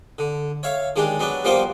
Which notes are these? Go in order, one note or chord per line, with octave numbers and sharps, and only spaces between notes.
D3
C#5 E5 F5 C#6
D#3 G#3 D4 G4
F#3 B3 D4
F3 G3 A#3 B3 G4 C5